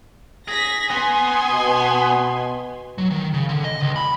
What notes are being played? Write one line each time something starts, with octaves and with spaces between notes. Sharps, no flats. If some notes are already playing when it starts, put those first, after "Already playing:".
G#4 A#6 B6
B3 G#5 C6
B2
F#3
D#3
C#3
D3
D#5
C#2
B5